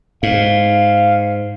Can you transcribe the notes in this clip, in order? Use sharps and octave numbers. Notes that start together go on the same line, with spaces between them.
G#2 F5